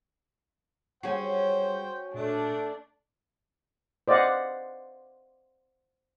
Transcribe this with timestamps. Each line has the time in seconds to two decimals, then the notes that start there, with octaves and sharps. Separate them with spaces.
1.03 G3 C#4 F#4 G#4 C5 G5 C7
2.14 A#2 A3 D4
4.08 C5 D5 D#5 F5 F#5